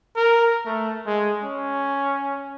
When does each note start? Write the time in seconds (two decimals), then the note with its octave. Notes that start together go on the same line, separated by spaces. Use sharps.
0.16 A#4
0.66 A3
1.06 G#3
1.43 C#4